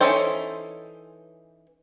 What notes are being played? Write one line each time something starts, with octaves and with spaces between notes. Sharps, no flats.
E3 C#4 D#4 A4 C5